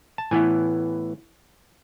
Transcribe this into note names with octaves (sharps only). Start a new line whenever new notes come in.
A5
A2 E3 B3 E4 G#5